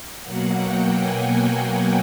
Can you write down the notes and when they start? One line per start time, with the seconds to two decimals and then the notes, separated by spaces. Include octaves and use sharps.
0.23 B2 F#3 A#3 F#5
0.58 G5
0.92 G#5